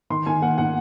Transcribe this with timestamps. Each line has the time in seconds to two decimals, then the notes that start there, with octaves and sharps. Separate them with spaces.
0.10 D#3 C6
0.26 D#3 G#5
0.42 A#3 F#5
0.58 D#3 F#5